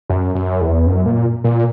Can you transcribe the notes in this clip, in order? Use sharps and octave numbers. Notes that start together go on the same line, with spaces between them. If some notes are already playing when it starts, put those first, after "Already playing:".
F#2
F#2
E2
F#2
A#2
A#2